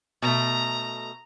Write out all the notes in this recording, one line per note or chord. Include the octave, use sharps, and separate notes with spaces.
B2 A3 A#5